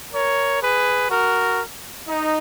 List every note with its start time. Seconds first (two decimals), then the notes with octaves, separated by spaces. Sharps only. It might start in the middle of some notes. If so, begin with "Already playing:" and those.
0.12 A#4 C#5
0.61 G#4 B4
1.09 F#4 A#4
2.07 D#4